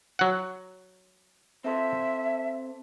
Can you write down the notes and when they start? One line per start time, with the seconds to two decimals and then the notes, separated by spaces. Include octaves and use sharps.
0.19 F#3 F#5
1.64 C4 A4 C5 E5